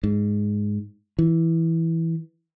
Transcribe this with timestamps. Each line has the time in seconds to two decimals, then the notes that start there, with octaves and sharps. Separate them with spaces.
0.04 G#2
1.19 E3